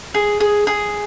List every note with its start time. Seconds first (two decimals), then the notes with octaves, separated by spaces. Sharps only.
0.14 G#4
0.40 G#4
0.67 G#4